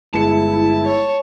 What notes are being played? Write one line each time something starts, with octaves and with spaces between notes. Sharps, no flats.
G1 G#3 E4 A5 C#7
C#5